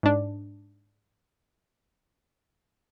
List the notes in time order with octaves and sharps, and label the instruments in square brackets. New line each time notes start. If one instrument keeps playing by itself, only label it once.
[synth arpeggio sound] G#2 D4